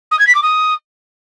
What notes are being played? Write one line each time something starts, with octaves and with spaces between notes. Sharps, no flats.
D#6
G#6
B6
D6
D#6